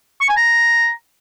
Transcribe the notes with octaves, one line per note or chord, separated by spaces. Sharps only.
C#6
G#5
A#5